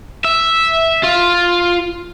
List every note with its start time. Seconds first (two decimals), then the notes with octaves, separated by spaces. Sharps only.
0.25 E5
1.03 F4